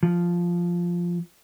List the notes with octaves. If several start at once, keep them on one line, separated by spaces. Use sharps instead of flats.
F3